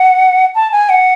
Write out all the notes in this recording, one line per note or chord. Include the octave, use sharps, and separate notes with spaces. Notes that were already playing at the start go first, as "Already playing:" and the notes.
Already playing: F#5
A5
G#5
F#5